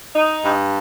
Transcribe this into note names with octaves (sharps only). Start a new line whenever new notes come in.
D#4
G2